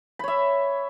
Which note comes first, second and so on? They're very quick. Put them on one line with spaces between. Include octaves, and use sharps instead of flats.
B5 C#5 E5